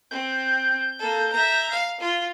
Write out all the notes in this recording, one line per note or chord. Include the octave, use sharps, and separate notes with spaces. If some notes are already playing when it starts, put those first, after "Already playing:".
C4 G6
A#3 A4
E5 A#5
F5
F4